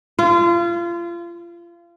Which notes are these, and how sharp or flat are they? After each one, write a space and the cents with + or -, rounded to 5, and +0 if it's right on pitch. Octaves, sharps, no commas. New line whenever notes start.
F4 -30